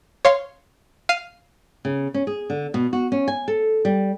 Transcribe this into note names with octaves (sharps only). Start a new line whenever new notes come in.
C#5 F5 C6
F5 C7 D#7
C#3
C#4
G#4
D3
B2
F#4
C#4
G#5
A4
G3